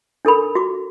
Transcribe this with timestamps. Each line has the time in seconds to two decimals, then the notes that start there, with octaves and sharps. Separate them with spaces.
0.25 D4 A4 A#4 B5
0.55 F#4 D6